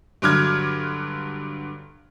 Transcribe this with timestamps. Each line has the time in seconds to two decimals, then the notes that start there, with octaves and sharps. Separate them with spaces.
0.22 G2 D3 F#3 D6 F6 G#6